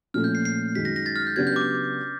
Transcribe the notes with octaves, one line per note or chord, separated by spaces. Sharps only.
A#2 F3 A3 C#4 F6
G6
C7
C7
F#2 D#3 G#3 B6
A#6
A#6
A6
F6
G6
C#3 F#3 B3 D4 G4 G#6
G6
D6